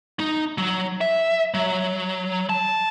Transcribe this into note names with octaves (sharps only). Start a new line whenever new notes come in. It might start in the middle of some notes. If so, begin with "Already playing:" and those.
D#4
F#3
E5
F#3
A5